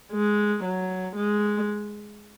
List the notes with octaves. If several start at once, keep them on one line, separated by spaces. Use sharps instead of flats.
G#3
F#3
G#3